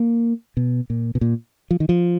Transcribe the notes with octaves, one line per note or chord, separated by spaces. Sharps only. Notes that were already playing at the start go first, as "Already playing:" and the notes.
Already playing: A#3
B2
A#2
B2
A#2
F3
D#3
F3